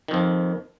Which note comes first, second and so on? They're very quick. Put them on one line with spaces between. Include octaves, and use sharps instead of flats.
D#3 F2 F3